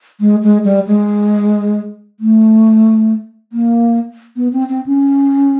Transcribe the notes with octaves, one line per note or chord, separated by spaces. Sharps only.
G#3
G#3
G3
G#3
A3
A#3
B3
C4
C4
C#4